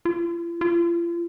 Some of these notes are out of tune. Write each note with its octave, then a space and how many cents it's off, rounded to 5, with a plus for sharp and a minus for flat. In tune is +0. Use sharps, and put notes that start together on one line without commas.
F4 -45
F4 -40